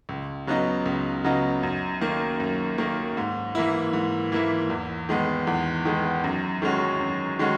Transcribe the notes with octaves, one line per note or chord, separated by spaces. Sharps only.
C#2
C#3 F#3 B3 D#4
C#2
C#3 F#3 B3 D#4
F#2
D#3 A#3
F#2
D#3 A#3
G#2
E3 A#3 E4
G#2
E3 A#3 E4
E2
D#3 G#3 B3
E2
D#3 G#3 B3
F#2
D#3 G#3 C#4 F#4
F#2
D#3 G#3 C#4 F#4